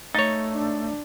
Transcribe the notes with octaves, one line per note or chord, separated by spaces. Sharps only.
A3 D#4 C#5 A6
D4